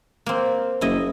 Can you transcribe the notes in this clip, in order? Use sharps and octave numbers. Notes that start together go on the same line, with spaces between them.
A#3 C4
F#1 E4 D#5